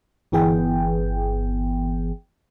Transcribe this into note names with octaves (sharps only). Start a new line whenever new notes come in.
G1 E3 B3 G#4 G5